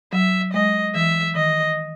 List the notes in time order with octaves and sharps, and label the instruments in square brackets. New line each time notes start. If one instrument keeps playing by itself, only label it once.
[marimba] F#3 [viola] E5
[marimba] G#3 [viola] D#5
[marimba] E3 [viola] E5
[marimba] D#3 [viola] D#5